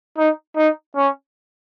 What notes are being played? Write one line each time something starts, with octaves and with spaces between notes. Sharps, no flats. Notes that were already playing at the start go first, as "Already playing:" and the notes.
D#4
D#4
C#4